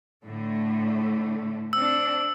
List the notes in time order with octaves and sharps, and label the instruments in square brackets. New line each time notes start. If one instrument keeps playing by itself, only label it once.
[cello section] A2 D3 A3
[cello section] C4 D4 [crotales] E6